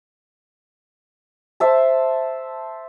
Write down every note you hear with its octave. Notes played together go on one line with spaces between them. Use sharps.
C5 E5 A5